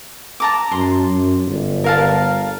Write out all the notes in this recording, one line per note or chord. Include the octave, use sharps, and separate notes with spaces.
A5 A#5 D6
F#2 C6
F#2
G1
A#4 F5 A5